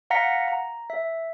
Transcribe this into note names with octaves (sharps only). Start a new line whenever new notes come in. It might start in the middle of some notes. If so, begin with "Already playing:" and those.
F5 F#5 A#5 A#6 B6 C#7
A#5
E5